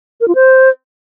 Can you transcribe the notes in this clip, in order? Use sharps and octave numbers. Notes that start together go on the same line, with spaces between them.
A#4
F4
C5